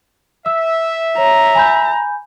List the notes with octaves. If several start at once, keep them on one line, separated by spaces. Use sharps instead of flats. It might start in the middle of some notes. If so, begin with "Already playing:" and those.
E5 E6
C#5 A#5
G#5 B5 G6